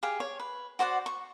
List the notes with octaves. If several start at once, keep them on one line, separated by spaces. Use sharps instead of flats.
G4 G#4 F5
C#5
B4
F#4 C5 D5 F#5
C#6